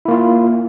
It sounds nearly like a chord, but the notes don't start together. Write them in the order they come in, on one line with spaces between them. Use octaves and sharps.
E4 A#3 F4